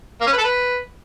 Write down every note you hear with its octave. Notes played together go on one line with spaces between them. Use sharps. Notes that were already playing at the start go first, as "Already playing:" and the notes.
A#3
C#4
B4
A4
B4